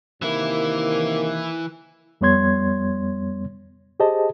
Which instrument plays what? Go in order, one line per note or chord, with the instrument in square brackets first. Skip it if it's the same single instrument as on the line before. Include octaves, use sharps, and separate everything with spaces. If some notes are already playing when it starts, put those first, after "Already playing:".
[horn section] C3 D#3 A#3 [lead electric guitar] E3 E4
[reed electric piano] F2 G3 B3 C#5 C6 G#6
G4 G#4 C5 D#5 A5